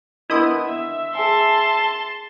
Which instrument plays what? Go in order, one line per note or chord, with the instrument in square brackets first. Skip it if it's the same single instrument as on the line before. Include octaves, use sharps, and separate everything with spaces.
[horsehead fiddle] B3 [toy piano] D4 A#4 C6 [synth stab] E4 D#5 D#6
[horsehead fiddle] E5
[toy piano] G#4 G#5 [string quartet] A5 C6